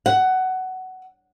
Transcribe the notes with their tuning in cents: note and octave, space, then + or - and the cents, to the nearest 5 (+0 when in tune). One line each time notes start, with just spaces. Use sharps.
F#5 +15